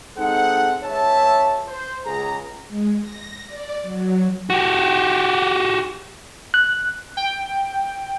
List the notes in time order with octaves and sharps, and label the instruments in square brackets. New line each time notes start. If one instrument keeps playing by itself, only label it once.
[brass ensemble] G#3 C4 D#4 A4 C5 F#5
C#2 C#5 E5 A5
C5
C#2 G#4 A#5
[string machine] G#3
A#6
D5
F#3
[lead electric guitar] F#4 G4
[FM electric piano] F#6
[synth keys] G5